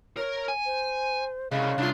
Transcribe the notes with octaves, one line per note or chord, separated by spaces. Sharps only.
A#4 C#5
G#5
C5
C2 C#3 G#3 F5
C2 D4 F4